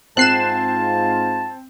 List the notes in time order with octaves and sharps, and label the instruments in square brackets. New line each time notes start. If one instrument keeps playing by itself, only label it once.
[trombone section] G#2 F4 [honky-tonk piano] C4 [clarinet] A5 [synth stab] F#6 C7 E7